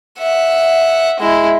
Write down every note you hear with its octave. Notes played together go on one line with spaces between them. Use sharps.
E5 F#5
G#3 E4